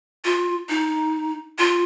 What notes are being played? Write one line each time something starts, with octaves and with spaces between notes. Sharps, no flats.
F4
D#4
F4